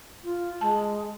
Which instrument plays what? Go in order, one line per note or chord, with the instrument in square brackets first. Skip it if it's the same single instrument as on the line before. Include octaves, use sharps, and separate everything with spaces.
[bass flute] F4
[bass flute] G#3 [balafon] A5